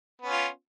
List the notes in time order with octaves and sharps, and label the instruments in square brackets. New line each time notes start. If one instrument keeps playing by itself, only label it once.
[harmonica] B3
C#4
F4